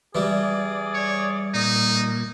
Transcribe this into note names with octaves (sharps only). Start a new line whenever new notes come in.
E3 G3 G#4 D5
C#5
A#2 D#4